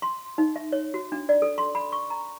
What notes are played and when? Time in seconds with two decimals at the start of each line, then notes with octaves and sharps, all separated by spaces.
0.02 C6
0.38 D#4
0.56 E5
0.72 C#5
0.94 F#4
1.12 D4
1.29 D5
1.42 A4
1.58 C6
1.75 B5
1.92 C#6
2.10 A#5